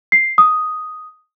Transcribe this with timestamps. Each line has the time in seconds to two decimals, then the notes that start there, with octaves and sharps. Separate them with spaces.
0.12 C7
0.38 D#6